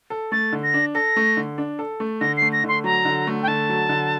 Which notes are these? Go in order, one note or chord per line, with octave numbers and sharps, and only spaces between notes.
A4
A3 A6
D3
A#6
D4
A4 A#6
A3
D3
D4
A4
A3
D3 A#6
A3 C7
A#6
D3 C6
F#3 A#5
D3
A3
G5
D3 A5
F#3
D3